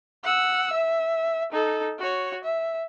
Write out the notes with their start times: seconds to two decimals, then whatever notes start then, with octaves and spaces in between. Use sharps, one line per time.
0.23 F#5 E6
0.73 E5
1.52 D#4 A4
1.99 F#4 C#5
2.44 E5